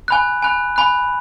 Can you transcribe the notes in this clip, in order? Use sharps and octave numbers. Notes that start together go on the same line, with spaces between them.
G#5 B5 F#6
G#5 B5 F#6
G#5 B5 F#6